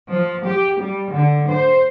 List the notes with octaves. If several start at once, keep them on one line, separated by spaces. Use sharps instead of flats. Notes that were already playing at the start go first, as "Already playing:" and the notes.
F3
G4
G3
D3
C5